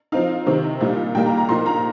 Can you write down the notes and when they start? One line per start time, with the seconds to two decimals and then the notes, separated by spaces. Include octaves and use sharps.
0.12 F3 C4 D#4 F5
0.46 C3 D#3 C4 D#4
0.80 A#2 G3 D#4
1.15 A#2 G3 A#3 D#4 G5
1.26 A#5
1.37 A#5
1.49 A#2 F3 A#3 D#4 C6
1.66 A#5